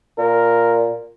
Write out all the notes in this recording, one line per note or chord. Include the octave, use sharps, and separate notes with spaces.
A#2 A#4